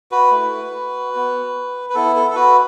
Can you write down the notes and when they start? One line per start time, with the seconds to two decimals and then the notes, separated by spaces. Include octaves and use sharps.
0.12 F#4 B4
0.31 A3 E4
1.14 B3 F#4
1.90 B4
1.95 B3 E4 A4
2.16 A4
2.30 A4
2.35 F#4 B4